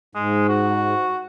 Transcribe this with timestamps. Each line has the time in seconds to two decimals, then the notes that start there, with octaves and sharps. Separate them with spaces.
0.15 G#2 G#3
0.49 F#4